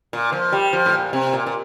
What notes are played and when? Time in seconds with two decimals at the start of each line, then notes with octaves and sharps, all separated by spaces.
0.13 A#2
0.32 F3
0.52 G3
0.73 F3
0.86 A2
0.93 A#2
1.13 C3
1.33 A#2
1.46 A#2